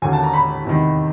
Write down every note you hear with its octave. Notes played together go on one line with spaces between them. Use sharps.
D#2 D3 F#3 A#3 C#4 G#5
A5
A#5
B5
E2 C3 D#3